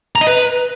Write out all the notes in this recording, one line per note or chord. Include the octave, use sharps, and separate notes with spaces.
A#5
D#5
B4